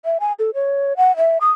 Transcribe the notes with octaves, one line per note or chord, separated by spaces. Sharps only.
E5
G#5
A4
C#5
F#5
E5
D#6